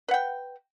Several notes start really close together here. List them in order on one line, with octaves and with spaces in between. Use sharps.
B4 F#5 G5